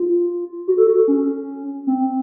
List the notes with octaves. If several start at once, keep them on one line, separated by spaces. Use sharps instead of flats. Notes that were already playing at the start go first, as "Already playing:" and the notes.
Already playing: F4
F#4
A4
F#4
A4
C#4
C4